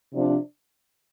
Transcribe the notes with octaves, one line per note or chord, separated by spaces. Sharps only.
C3 F3 D4